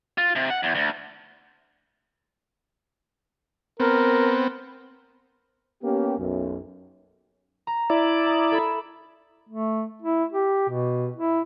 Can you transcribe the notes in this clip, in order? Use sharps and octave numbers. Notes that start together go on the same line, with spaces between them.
F4
C3
F#5
E2
D2
B3 C4 A#4
A#3 B3 C#4 G4
B1 F#2
A#5
E4 D5
A#5 D#6
A4 E5 B5
A3
E4
G4
B2
E4